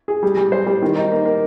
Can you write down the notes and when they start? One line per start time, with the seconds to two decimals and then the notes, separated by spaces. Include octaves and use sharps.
0.08 G#4
0.23 G3
0.37 G3
0.52 C5
0.66 G3
0.82 D#3
0.96 D#4
1.12 A#3
1.25 A#3